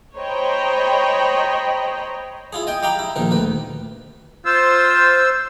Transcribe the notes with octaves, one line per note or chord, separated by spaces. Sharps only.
C5 C#5 D#5 G5 A#5 B5
E4 F4 G#4
D#5 G5 G#5
G4 F5 G5 A#5 B5
E4
A#1 D#3 A#4
D2 B4
F4 C5 E6